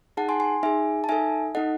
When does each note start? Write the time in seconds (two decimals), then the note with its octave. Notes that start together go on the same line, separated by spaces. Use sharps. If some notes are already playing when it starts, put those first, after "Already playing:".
0.17 D#4 G#4 F#5 A5
0.29 G#5 C6
0.40 G#5 C6
0.63 D#4 G#4 E5 G#5
1.04 A5
1.09 D#4 A4 E5 G#5
1.55 D#4 A4 D#5 F#5